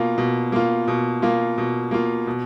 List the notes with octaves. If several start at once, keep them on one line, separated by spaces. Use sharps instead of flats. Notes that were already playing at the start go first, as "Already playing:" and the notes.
Already playing: B2 A#3 F4
B2
A#3 F4
B2
A#3 F4
B2
A#3 F4
B2